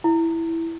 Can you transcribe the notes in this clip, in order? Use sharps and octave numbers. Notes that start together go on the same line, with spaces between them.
E4